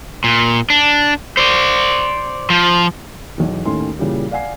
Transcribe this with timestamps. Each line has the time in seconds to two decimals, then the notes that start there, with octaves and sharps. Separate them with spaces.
0.24 A#2
0.70 D4
1.37 C5 D5
2.50 F3
3.38 B1 E2
3.66 D#2 A2 D#3 A3 C#4 C6
3.99 A#2 C#3 E3 G3
4.31 D5 F5 F#5 G#5 C7